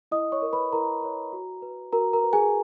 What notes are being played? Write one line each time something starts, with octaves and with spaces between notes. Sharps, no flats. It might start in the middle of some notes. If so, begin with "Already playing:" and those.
E4 D#5 D#6
C#5 C#6
A#4 C#5
B4 B5
E4 A#4 A#5
A#4 C#5
F#4
B4
F#4 A#4 A#5
A#4 A#5
B4
G#4 G#5